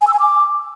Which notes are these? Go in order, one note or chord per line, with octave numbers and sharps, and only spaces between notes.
G#5
E6
G#5
D6